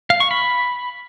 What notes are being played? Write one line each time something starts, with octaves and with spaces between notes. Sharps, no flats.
F5
C#6
B5